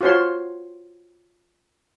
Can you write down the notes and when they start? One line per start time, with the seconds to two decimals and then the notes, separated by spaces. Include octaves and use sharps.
0.01 F4 F#4 C5 C#5 C6